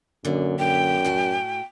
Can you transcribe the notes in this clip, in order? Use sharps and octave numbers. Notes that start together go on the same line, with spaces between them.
F#2 A#2 D3
F#2 G5
A2 F#4 G#5